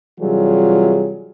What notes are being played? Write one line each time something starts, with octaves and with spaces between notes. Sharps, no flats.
C3 E3 F#3 G3 F4 G#4